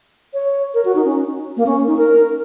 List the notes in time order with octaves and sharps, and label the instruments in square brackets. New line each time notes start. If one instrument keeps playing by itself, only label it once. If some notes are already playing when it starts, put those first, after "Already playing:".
[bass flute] C#5
A#4
F#4
D#4
C#4
A#3
C#4
D#4
A#4